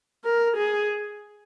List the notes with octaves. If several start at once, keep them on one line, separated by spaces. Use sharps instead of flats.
A#4
G#4